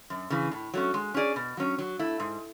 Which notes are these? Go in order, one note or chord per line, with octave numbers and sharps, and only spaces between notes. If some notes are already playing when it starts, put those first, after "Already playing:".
F#2
C#3 E3
A2
F#3 A3 C#4
G#3
C#4 G#4 D5
B2
F#3 C#4
F#3
A3 E4
G#2